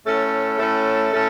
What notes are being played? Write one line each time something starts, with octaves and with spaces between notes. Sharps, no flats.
A2 A3 C#4 A4
A2 A3 C#4 A4
A2 A3 C#4 A4